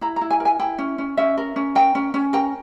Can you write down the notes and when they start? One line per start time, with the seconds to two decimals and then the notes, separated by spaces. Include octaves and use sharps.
0.01 E4 A#5
0.16 A#5
0.21 E4
0.30 G#5
0.40 A#4
0.45 G#5
0.59 E4 G5
0.78 C#4
0.98 C#4
1.17 C#4 E5
1.37 A#4
1.56 C#4
1.75 A#4 G5
1.95 C#4
2.14 C#4
2.33 A#4 G5